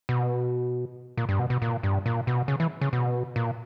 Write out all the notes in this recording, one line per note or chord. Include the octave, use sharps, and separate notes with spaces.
B2
A#2
G2
B2
B2
A#2
G2
A#2
B2
C#3
E3
C#3
B2
A#2